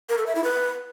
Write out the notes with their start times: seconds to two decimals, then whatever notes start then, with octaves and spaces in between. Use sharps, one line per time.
0.09 A#4
0.18 A4
0.27 E5
0.35 E4
0.44 B4